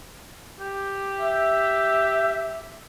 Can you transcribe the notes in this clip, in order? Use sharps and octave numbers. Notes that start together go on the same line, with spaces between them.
G4
E5